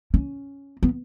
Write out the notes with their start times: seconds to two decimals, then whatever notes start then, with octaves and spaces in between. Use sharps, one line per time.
0.14 C#4
0.83 B3